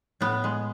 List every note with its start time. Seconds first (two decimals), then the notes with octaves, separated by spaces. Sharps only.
0.21 A2 B3
0.44 G#3